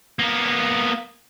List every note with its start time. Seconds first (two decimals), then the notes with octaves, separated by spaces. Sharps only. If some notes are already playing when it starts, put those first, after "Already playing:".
0.19 A#3 B3